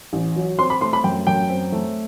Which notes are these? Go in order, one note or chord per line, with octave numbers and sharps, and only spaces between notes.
A1
F#3
C4 C6
B5
A3 C6
B5
F#2 G5
F#2 G5
C4
A3